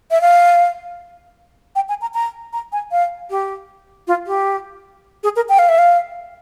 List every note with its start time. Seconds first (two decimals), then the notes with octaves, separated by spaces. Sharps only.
0.11 E5
0.21 F5
1.76 G5
1.89 G#5
2.01 A#5
2.14 A#5
2.53 A#5
2.72 G#5
2.92 F5
3.30 G4
4.07 F4
4.27 G4
5.23 G#4
5.36 A#4
5.49 G5
5.59 F5
5.69 E5
5.78 F5